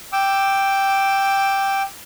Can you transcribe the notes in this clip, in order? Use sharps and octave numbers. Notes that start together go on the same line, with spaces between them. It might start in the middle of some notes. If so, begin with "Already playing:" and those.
G5 D6 E6